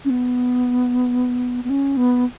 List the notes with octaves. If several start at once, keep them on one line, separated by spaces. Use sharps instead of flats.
C#4
B3
B3
C#4
B3